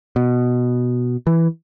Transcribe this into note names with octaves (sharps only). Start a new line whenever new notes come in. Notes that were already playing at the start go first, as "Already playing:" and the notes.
B2
E3